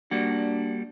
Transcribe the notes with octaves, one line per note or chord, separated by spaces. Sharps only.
G3 A#3 D4 F#4